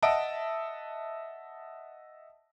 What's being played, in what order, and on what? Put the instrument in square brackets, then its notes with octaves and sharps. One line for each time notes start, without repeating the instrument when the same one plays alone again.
[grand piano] D#5 E5 F#5 A5 D7